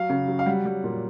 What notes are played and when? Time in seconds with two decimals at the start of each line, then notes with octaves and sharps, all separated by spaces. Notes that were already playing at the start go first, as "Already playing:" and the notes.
Already playing: F#3 F5
0.10 C#3
0.28 F#3
0.39 F5
0.46 G3 F#5
0.65 G3
0.84 A#2